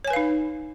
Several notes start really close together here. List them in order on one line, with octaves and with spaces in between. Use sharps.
C#5 G#5 B4 F5 D#4